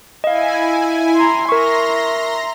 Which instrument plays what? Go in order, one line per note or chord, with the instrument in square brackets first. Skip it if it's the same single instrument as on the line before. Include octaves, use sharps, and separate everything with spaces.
[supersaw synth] E4 G#5 [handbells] D#5 F5
[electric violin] A#5 C6
[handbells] A#4 C#6 [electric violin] E5 [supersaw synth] A#5 C6 A#6